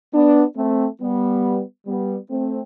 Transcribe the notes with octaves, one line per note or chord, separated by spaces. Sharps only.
B3 D4
A3 C4
G3 B3
G3 B3
A3 C4